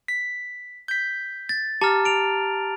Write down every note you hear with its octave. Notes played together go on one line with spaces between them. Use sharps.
B6
G6 B6
A6
G4 A5 A#5 F6
D7 F7